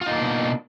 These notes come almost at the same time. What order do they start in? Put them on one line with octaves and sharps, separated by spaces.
F4 D#4 A#3 D4 B2